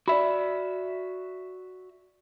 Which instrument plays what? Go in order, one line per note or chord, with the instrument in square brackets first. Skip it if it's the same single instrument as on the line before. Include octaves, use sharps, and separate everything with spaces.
[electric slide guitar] F#4 E5 [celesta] D5 B5